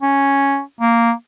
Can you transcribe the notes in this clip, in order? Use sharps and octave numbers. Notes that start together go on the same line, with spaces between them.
C#4
A#3